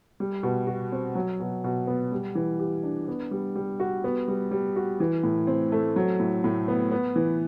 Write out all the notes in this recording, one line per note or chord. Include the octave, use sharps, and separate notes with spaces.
G3
B2
F#4
C4
F#3
B2
B2
B3
G3
E3
G4
D4
B3
G3
G3
F#4
B3
G3
G3
F#4
E3
A2
C4
A3
F#3
A2
A2
B3
B3
E3